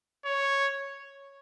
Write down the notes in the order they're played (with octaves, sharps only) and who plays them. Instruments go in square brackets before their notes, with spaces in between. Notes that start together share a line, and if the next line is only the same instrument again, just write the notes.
[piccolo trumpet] C#5